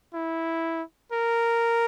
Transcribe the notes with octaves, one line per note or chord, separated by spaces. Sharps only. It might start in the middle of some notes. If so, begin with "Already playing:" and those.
E4
A#4